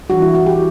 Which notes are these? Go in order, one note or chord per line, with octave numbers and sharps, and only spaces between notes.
E3 G3 D4 F#4
E4
F#4
G4